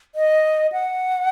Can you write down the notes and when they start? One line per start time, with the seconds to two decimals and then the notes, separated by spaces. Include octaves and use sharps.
0.15 D#5
0.72 F#5